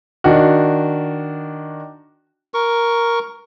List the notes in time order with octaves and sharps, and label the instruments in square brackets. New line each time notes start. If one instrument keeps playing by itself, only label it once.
[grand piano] D#3 D4 F#4
[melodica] A#4 C#6